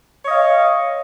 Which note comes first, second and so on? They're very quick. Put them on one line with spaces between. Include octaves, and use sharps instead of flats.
C#5 D#5 F5